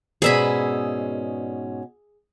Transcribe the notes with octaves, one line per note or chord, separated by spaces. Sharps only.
G#2 B2 C#4 G#4 B4 D5 E5 B5